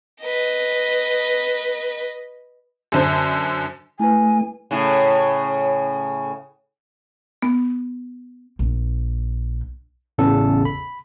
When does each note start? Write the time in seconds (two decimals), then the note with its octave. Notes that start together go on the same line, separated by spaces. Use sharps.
0.23 B4 D#5
2.92 F#2 D3 C5
4.00 A3 E4 B4 G#5
4.71 A2 C#3
7.42 B3
8.59 A#1
10.18 A1 E2 C#3 A4
10.65 B5